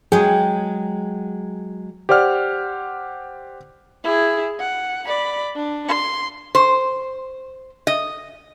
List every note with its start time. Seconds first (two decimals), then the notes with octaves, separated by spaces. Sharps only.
0.12 F#3 G#3 G#4 G5
2.09 G4 C5 D5 F#5 F6
4.04 E4 G#4
4.60 F#5
5.07 D5 B5
5.55 D4
5.88 C6
6.55 C5
7.87 D#5